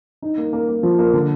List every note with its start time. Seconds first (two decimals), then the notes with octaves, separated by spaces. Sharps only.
0.22 D#4
0.38 A#3
0.53 A#3
0.69 A#3
0.83 F3
0.99 A#3
1.14 D3